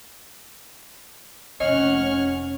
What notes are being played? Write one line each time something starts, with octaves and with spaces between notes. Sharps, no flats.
F1 C#4 C#5 D#5 F#5 F6